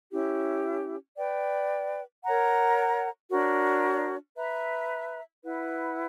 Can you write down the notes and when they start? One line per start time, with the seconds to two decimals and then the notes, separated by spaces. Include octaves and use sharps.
0.11 C#4 E4 G4
1.17 B4 D5 G5
2.23 A#4 C#5 F#5 A#5
3.30 D4 F#4 A#4 C#5
4.36 B4 E5 A#5
5.43 E4 B4 F#5